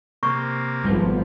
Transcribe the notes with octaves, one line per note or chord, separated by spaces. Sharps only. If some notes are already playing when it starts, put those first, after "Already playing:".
C3 A#3 C#6
G#1 F3 G3 A3 B3